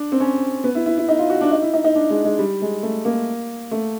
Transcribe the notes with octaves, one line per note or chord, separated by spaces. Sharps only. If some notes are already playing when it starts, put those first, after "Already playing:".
Already playing: D4
C4
C#4
B3
E4
E4
E4
D#4
F4
F#4
D4
D#4
E4
D#4
D#4
D4
G#3
G#3
G3
G#3
A3
A#3
A3